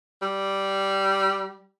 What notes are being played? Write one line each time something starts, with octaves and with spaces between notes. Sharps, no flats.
G3